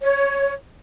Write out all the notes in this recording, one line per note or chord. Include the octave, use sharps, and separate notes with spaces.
C#5